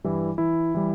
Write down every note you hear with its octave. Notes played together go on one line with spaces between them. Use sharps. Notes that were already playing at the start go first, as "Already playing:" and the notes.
G2 E3 G3 E4
E3 E4
E3 G3